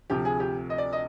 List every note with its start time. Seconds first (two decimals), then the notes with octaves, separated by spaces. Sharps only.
0.10 D2 C3 F3 G4
0.25 G#4
0.40 G4
0.70 D#5
0.78 D5
0.93 D#5